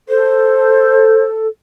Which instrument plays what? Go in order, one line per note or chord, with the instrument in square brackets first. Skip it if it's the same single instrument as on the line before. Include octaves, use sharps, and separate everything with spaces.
[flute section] A4 [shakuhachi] C5